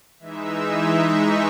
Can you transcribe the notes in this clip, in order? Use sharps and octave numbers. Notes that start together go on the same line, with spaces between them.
E3 G#3 D#4 E5
C#6